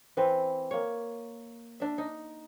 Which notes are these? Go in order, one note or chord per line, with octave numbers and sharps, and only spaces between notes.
E3 C4 B4
A#3 C#5
D4 E5
D#4